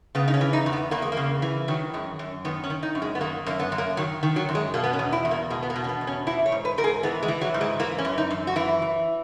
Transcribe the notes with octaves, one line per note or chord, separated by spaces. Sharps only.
C#3 B3
D#4
C#4
E3
D#4
E2
B3
E2 A#3
G#3
C#3 A#3
E3
D#3 F#3
F#2 G#3
F#2
D#3 B3
C#4
D#3
D#4
F#2
G#3
B3
D#3 A#3
F#2 A#3
B3
F#2
A#3
D#3 F#3
D#3
F#3
F#2
G#3
B2 A#3
B3
C#4
E2
E4
E2
A#3
B2 G#3
B3
A#3
B2
C#4
B3
E2
C#4
E3 E4
C#5
G#2
B4
G#2 A#4
G#4
E3 B3
G#3
E3
F#3
G#2
G#3
E3 A#3
C#4
F#2
D#4
F#2
F#4
E3 E4
E3